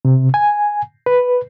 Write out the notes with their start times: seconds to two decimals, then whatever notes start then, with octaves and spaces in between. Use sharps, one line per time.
0.05 C3
0.34 G#5
1.06 B4